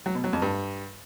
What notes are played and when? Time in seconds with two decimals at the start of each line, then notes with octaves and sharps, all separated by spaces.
0.06 F#3
0.15 B2
0.24 F#3
0.33 F2
0.42 G2